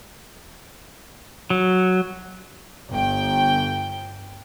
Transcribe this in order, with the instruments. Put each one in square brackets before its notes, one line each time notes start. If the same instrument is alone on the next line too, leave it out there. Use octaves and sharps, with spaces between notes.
[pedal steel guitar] F#3
[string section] G1 G5